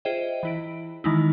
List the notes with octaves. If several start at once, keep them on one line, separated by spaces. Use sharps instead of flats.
F4 G#4 C5 D#5 E5 G5
E3 E4 D7
D#3 E3 G#3 D#4 E4